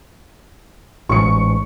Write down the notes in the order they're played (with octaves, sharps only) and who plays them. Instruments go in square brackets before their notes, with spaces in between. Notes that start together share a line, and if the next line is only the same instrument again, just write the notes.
[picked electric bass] A1 G#2 [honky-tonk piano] C#6 C#7